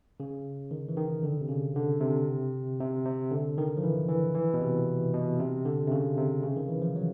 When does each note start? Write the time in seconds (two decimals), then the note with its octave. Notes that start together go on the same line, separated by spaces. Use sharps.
0.20 C#3
0.71 D#3
0.89 E3
0.97 D#3
1.23 D3
1.41 C3
1.49 C#3
1.75 D3
2.01 C3
2.80 C3
3.06 C3
3.31 D3
3.58 D#3
3.77 F3
3.83 E3
4.09 E3
4.35 E3
4.54 B2
4.61 C3
5.13 B2
5.40 C3
5.65 D3
5.88 C3
5.91 C#3
6.17 C3
6.44 C#3
6.56 D#3
6.69 E3
6.82 F3
6.96 F#3